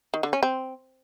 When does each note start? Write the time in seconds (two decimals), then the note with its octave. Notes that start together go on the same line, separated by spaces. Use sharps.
0.14 D#3
0.23 D3
0.33 C#4
0.43 C4